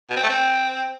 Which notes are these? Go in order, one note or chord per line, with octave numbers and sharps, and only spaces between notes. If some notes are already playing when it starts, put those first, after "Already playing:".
B2
C4
A3
C4